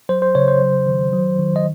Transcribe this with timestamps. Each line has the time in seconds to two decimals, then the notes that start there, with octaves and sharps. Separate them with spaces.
0.09 F#3 C5
0.22 C5
0.35 C#3 C#5
0.48 C5
0.62 F#3
0.87 D#3
1.13 F#3
1.39 D#3
1.56 D#5